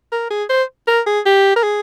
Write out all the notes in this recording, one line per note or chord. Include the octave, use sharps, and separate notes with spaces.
A#4
G#4
C5
A#4
G#4
G4
A#4
G#4